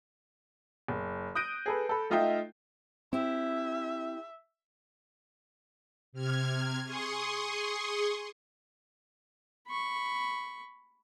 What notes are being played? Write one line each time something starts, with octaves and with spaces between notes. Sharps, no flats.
F#1
D#6 F#6 G6 A#6 D7 D#7
G#4 A4 B4
A4 B5
A3 D#4 F4 D#5 E5 G5
C4 E4 G4 E5
C3 F6 G#6
G#4 C6 C#6 D#6
B5 C#6